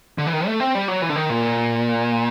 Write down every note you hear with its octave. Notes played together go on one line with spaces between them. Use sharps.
D3
E3
D#3
A3
C4
G3
F#3
E3
D3
D#3
A#2